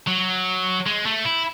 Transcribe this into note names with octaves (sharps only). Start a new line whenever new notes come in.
F#3
G#3
A3
E4